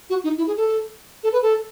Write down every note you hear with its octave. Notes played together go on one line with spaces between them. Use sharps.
F#4
D#4
E4
G#4
A4
A4
B4
A4